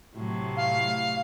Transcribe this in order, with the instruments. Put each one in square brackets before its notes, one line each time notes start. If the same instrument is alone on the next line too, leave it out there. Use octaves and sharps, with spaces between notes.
[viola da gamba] A2 C3 F#3
[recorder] F5